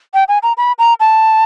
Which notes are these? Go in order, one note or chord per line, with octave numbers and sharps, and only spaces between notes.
G5
G#5
A#5
B5
A#5
A5